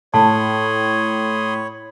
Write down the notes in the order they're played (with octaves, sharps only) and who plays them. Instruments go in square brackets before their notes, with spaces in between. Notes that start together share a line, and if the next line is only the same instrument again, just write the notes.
[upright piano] A2 [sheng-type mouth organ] C#5 [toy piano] A5 [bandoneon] B5 C6 D#6